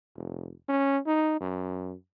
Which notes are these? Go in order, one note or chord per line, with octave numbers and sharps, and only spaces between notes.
F1
C#4
D#4
F#2